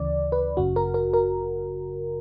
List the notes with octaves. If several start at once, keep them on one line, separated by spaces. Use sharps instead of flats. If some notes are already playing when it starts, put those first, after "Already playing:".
Already playing: D2 C#3 E3 D5
B4
G1 F#2 C#3 F#4
A#4
A#4
A#4